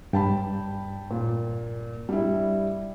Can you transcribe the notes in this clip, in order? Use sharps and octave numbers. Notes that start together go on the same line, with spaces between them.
G2 G5 A5 B5
A#2
G3 D4 E4